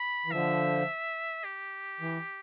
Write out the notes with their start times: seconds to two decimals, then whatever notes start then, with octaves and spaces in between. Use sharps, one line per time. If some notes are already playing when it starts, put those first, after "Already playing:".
Already playing: B5
0.26 E3
0.32 D3 F3 E5
1.45 G4
2.01 E3